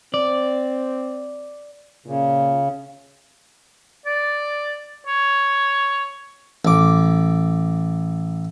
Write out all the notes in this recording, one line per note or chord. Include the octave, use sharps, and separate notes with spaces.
C4 D5
A#2 C#3
D5
C#5
A1 D6